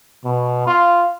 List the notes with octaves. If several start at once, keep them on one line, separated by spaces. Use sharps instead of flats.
B2
F4